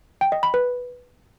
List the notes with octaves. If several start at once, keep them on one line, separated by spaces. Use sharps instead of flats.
G5
D#5
B5
B4